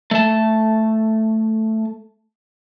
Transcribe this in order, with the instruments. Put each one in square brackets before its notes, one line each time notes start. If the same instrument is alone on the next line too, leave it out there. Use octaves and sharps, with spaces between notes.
[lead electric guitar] A3 A5